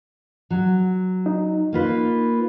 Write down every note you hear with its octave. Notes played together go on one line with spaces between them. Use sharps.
F#3
D#4
A#3 F4 B4